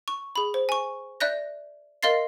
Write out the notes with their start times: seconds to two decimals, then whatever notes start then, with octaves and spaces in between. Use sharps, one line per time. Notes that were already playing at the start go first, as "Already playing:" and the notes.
0.08 C#6
0.36 G#4 B5
0.54 C5
0.69 G#5 C#6
1.20 D5 E5 F#6 G6 A#6
2.03 A#4 D#5 F5 C6 A6 C7